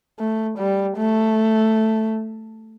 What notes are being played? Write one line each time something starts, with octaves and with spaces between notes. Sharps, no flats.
A3
G3
A3